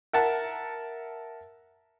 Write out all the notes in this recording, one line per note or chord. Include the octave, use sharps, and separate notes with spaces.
A#4 E5 F#5 A5